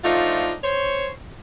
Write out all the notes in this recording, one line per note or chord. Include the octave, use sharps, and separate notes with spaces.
F3 A3 D4 D#4 F4
C5 C#5